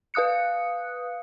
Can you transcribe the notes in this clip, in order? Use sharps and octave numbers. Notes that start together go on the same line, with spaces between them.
B4 F5 D#6 F#6 C#7